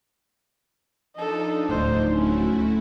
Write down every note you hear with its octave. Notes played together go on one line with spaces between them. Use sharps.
F3 D4 D#4 A4 D#5
D1 A2 C5
A3 C#4 E4 F#4